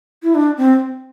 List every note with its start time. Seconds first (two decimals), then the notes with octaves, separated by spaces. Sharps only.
0.23 E4
0.35 D4
0.57 C4